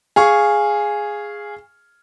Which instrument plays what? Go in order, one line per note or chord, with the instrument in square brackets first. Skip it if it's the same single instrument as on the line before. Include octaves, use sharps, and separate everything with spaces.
[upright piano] G#4 F5 C#6